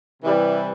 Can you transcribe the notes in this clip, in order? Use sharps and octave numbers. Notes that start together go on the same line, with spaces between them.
C3 E3 G3